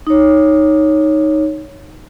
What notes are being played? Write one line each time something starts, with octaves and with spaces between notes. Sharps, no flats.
D#4 C#5